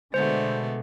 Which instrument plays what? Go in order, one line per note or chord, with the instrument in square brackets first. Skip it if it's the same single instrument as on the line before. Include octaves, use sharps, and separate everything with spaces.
[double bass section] B2 D3 [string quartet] G#3 A3 B3 [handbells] C5